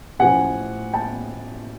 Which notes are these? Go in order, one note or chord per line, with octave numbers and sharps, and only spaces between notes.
A1 A2 F3 F#5 G#5
G5 A5